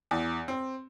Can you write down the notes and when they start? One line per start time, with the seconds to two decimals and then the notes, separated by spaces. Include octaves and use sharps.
0.11 E2
0.48 C4